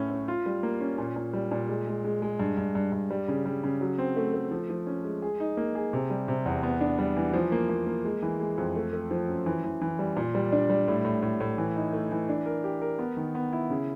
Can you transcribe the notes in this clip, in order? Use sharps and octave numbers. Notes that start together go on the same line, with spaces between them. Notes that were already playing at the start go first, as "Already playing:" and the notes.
Already playing: A2 A3 C#4
C#4
F4
G3
A#3
C#4
A#2
A#2
G3
A#2
G#3
G#3
G#3
G#3
G2
G2
G2
G2
G3
C#3
G3
C#3
F#3
C4
A3
A3
F3
F3
C#4
G#3
G#4
D#4
A#3
G#4
C3
G3
C3
E2
B3
D4
G3
E3
F3
A#3
A#3
A#3
G#3
E3
G#3
F2
A3
A3
F3
F#2
E3
E3
E3
G3
A#2
G3
D4
G3
A2
A2
A2
A2
E3
D#4
A3
E3
D4
A#4
G4
A#4
B3
D#3
B3
E4
C#3